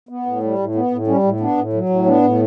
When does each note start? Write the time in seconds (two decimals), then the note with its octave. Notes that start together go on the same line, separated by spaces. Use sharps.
0.09 B3
0.26 A2
0.43 G3
0.58 A2
0.75 B3
0.91 A2
1.07 G3 C#4
1.23 A2
1.40 B3 D4
1.57 A2
1.73 F#3
1.89 A2
2.06 B3 D4
2.22 A2